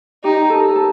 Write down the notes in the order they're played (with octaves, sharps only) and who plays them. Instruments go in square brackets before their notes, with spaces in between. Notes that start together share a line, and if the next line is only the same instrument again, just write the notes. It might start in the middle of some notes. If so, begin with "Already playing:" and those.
[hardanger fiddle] D#4 [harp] G4
[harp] A4
A4